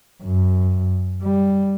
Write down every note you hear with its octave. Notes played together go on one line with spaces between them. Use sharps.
F#2
G3